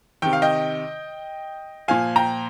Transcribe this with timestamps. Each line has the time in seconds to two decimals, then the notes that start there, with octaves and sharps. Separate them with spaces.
0.22 C3 D#3 G5
0.33 F5
0.42 D#5 G5
1.88 A#2 F3 F5 G#5
2.16 G5 A#5